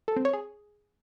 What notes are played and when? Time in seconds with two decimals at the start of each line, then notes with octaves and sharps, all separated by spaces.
0.08 A4
0.16 C4
0.25 C#5
0.33 G#4